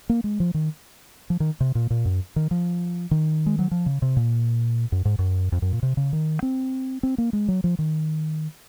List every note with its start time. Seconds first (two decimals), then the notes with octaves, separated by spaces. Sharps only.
0.09 A#3
0.24 G#3
0.40 F3
0.54 D#3
1.30 F3
1.40 D#3
1.60 C3
1.75 A#2
1.90 A#2
2.05 F#2
2.36 D#3
2.51 F3
3.11 D#3
3.46 G#3
3.59 F#3
3.71 F3
3.86 C#3
4.02 C3
4.17 A#2
4.92 F#2
5.05 G#2
5.19 F#2
5.52 F2
5.62 F#2
5.72 A#2
5.83 C3
5.97 C#3
6.13 D#3
6.42 C4
7.03 C4
7.18 A#3
7.33 G#3
7.48 F#3
7.64 F3
7.79 D#3